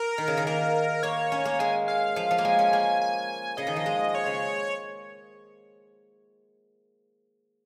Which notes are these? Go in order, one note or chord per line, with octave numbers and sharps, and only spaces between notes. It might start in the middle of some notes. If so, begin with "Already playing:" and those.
Already playing: A#4
D#3
C#3
D#3
A#3 A#4
A#3 C#5
C#4
A#3
G#3 G#5
F5
F3
F3
A#3
G#3 G#5
C#4
A#3
G#5
C#3 D#5
D#3
F3
G#3
C#5
C#3